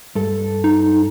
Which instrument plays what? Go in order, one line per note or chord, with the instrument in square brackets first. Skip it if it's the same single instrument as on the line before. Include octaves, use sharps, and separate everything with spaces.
[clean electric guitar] G2 A4
[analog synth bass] D#4